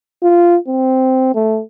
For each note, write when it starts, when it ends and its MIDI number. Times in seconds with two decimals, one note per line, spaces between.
0.23 0.57 65
0.68 1.33 60
1.35 1.61 57